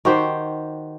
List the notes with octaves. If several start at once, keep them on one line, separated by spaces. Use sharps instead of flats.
D#3 F#4 G4 C5